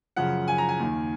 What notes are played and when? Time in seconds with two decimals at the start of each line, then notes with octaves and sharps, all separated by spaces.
0.16 F#2 C#3 F3 F#5
0.48 G#5
0.58 A#5
0.69 G#5
0.79 D#2 D#3